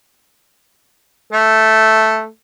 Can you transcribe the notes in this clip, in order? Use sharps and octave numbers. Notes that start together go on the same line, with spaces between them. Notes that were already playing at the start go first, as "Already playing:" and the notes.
A3